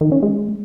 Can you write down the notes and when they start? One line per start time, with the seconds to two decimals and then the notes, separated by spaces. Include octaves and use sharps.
0.01 D#3
0.12 C#4
0.23 G#3